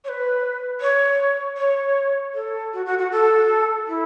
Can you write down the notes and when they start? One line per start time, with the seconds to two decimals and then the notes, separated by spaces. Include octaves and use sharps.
0.04 C#5
0.09 B4
0.81 C#5
1.57 C#5
2.34 A4
2.73 F#4
2.86 F#4
2.98 F#4
3.12 A4
3.88 E4